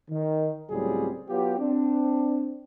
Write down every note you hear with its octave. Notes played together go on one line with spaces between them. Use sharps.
D#3
C#2 A2 F#3 G3 C4 G#4
F#3 B3 F4 G4
C4 D4